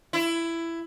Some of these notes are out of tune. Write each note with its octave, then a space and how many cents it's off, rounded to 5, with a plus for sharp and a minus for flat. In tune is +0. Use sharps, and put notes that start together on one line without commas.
E4 +15